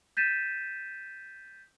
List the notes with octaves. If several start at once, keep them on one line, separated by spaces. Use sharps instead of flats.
G6 A6 B6 D#7 E7